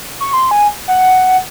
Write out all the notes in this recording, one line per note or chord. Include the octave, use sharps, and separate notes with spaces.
C#6
C6
G#5
F#5